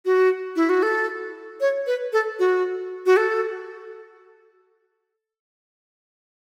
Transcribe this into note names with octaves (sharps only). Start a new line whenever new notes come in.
F#4
E4
F#4
A4
C#5
B4
A4
F#4
F#4
A4